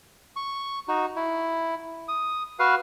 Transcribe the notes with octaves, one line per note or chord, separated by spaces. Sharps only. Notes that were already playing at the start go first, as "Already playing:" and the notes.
C#6
D#4 F#4
E4
D#6
F#4 B4 F5